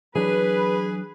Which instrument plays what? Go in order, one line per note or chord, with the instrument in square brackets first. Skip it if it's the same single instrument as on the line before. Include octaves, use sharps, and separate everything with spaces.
[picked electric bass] E3 F#3 D4 [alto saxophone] G#4 [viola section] B4